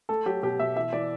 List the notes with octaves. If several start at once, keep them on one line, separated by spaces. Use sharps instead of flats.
A3 A4
F#3 G4
B2 G4
B2 E5
E3 E5
E3 D5